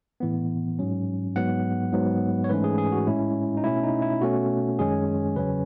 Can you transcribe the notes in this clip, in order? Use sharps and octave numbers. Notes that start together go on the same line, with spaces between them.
A2 E3 B3
G#2 F#3 C#4
G#2 F#3 B3 F#5
G#2 F#3 B3
C#5
G#2 E3 A3 C#4 B4
G#4
G#4
F#4
A2 G#3 C#4 E4
D#4
B2 A3 C#4 E4
D#4
E4
B2 A3 C#4 F#4
F#2 D#3 G#3 C#4 G#4
E2 C#3 F#3 C#4 B4